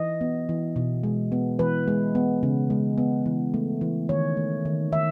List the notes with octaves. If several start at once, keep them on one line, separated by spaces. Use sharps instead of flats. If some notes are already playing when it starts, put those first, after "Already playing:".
Already playing: E3 D#5
B3
E3
B2
G#3
B3
E3 B4
G#3
B3
C#3
G#3
B3
E3
A3
E3
D#3 C#5
A3
D#3
D#3 E5